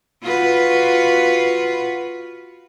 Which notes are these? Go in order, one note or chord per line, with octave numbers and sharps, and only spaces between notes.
F4 F#4 B4